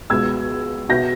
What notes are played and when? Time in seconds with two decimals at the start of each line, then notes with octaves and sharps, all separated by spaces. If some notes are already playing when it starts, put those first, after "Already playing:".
0.10 C#2 B2 E6 G#6
0.89 B2 G6 A#6